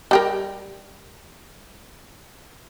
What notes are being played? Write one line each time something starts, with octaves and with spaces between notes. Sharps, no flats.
G3 G4 A#4